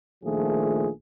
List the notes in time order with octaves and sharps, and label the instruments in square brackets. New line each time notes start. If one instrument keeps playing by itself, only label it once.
[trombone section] A#1 D#3 F3 A3 G#4